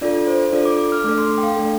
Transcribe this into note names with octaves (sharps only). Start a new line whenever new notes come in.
D4 F4 A4 D5
C5
D4 F4 A4 D5
D6
D6
F6
A3 D4 A4 D6
C6
G5
F5
A3 D4 A4